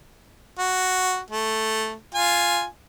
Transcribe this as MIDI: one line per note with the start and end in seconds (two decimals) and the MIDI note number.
0.59 1.21 66
1.30 1.95 57
2.15 2.65 65
2.15 2.65 80